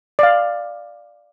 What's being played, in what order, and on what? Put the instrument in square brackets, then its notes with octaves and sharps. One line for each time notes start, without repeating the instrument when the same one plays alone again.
[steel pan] D5 F5